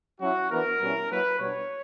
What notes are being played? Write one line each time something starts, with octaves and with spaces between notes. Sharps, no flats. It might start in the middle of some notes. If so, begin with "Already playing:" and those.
F#3 C#4 E4 F#4
E3 B3 D4 A#4
B2 G3 C#4 E4
F#3 A#3 E4 B4
B2 G3 B3 D4 C#5